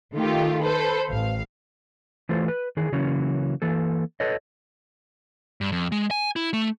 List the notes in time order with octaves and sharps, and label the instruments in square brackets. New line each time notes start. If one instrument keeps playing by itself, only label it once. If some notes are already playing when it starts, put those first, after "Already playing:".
[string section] D#3 A3 F4 G4
A4 B4 C5
A1 F5
[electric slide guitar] E3 A3 F4 A4 C5
B4
D#3 E3 G#4
C#3 E3 F#3 A#3 C#4
E3 A#3 A4
A4 B4 C#5 D#5
[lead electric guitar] G2
F2
G#3
G#5
E4
A3